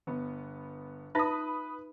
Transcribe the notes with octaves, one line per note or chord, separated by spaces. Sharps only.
G1 B3
D#4 F4 B4 E5 B5 D#6